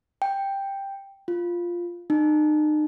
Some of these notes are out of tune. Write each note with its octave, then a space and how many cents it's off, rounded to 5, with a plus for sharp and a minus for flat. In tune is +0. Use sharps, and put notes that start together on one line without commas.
G5 +5
F4 +0
D#4 -40